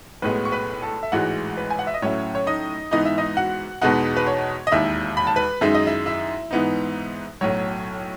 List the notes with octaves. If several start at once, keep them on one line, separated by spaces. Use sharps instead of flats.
B1 A2 G#3 B3 B4 B5
C#6
B4 B5
A4 A5
E5
A1 G#2 E3 G#3 F#4 F#5
B4
G#5
F#5
E5
D#5
A2 F#3 C#4 E4 C#5
C#5
D#4 D#5
G#2 E3 B3 D#4 D#5
E5
D#4 D#5
F#4 F#5
E2 B2 G#3 B3 D#4 F#4 F#5
B4
C#5
D#5
E1 D#2 D#3 E4 E5
B5
A5
B4 B5
F#2 D#3 G#3 D#4 E5
D#5
E4 E5
E4 E5
G#2 E3 B3 D#4
B1 A2 F#3 C#5